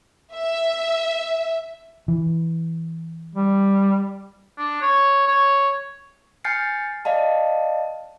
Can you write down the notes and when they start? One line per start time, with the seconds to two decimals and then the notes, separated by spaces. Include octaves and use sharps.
0.34 E5
2.08 E3
3.35 G3
4.58 D4
4.82 C#5
5.27 C#5
6.44 G#5 F6 G6 A6 C7 C#7
7.05 D5 D#5 F5 A5